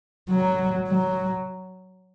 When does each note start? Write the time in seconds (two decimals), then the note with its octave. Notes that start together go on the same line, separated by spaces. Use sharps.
0.30 F#3
0.88 F#3